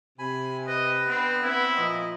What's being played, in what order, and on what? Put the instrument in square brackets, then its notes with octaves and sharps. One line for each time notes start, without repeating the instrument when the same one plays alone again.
[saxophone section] C3 [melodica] G#5 B5
[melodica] B4 [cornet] D#5
[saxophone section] D3 B3 [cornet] C4
[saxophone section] B3 C4 [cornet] E4
[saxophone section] A#2 F3 [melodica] D#5